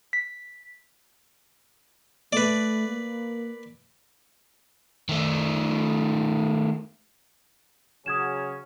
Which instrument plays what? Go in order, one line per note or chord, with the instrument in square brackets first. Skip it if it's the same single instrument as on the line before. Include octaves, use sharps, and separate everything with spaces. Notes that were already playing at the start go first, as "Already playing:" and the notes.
[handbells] B6
[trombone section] A3 [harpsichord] B4 D5
[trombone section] A#3
[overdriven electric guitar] D#3 A3
[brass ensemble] C#3 F#3 C#4 [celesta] D#6 G#6 E7